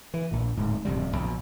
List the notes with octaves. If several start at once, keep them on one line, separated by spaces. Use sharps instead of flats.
E3
A#1 A#2
D1 G#2
D1 F2 C3 G3
A#1 B2